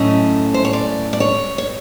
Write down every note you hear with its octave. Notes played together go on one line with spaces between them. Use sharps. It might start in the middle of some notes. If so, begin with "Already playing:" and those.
Already playing: A2 F#3 A3 C#4 D#5
C5
C#5
D5
D5
C#5
C#5